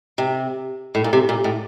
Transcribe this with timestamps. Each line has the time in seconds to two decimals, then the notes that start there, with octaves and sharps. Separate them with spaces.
0.18 C3
0.95 A2
1.04 A#2
1.13 C3
1.29 A#2
1.44 A2